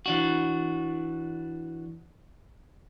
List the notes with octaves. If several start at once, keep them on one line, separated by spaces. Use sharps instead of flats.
E3 D4 F#4